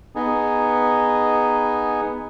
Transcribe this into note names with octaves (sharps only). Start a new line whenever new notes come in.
B3 D#4 G#4